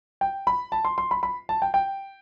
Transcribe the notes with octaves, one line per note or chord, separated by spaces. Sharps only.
G5
B5
A5
C6
C6
B5
B5
A5
G5
G5